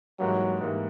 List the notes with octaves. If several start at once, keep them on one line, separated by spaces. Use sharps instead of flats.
G#2 E3 F#3 G3 A#3
G#2 E3 G3 A#3